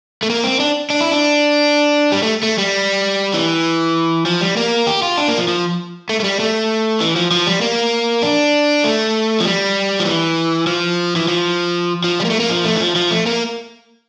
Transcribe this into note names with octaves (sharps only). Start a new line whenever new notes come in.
A3
A#3
C4
D4
D4
E4
D4
G3
A3
A3
G3
E3
F3
G3
A#3
G4
F4
D4
A#3
F3
F3
A3
A3
G3
A3
E3
F3
F3
G3
A#3
D4
A3
F3
G3
F3
E3
F3
E3
F3
F3
G3
A#3
A3
A#3
F3
A3
E3
F3
F3
A3
A#3